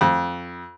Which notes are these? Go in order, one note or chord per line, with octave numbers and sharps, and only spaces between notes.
F2